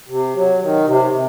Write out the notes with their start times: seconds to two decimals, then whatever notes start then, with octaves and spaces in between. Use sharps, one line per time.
0.09 C3
0.36 F#3
0.61 D#3
0.87 C3
1.12 C3